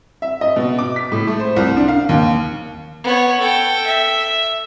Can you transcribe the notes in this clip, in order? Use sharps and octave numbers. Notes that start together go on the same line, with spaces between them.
E5
D#5
B2
D6
B6
A2
A3
C5
C2
D4
F5
D#2
B3 C#5
A4 G5
E5